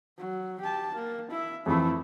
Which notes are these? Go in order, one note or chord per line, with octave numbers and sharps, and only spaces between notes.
F#3
G4 A5
A#3
E4 E5
F2 E3 A3 E4 B5